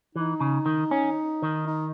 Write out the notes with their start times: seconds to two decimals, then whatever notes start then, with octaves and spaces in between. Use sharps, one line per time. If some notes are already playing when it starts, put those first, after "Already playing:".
0.15 E3 D#4
0.40 C#3
0.66 D#3
0.91 C#4
1.42 D#3
1.67 D#4